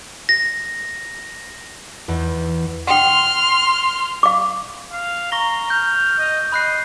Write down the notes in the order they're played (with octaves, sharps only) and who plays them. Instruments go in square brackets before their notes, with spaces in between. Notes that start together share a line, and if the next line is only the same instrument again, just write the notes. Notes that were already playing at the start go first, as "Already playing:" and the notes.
[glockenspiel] A#6
[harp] E2
[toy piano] F#5 G5 [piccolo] C6 [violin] F6
[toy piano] F5 D6
[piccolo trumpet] F5
[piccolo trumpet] A#5 [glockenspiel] C#6 A#6 G7
[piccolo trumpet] F6 [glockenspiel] G6
[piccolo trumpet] D#5
[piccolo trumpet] D#5 [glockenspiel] B5 F#6 C7